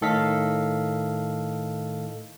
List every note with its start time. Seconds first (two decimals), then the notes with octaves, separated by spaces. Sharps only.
0.01 A2 D#3 A4 D#5 F5 B6